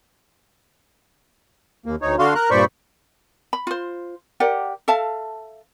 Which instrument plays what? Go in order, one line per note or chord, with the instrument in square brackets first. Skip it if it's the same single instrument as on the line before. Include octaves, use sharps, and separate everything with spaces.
[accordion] D#2 A#3
D2 D#4 C#5
D3 D4 F#4 F5 C6
A#4 A#5 F#6
G2 A#2 C5 D5 B5 C#6
[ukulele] B5
F4 C5
G4 A#4 D5 F#5
A4 E5 F5 A5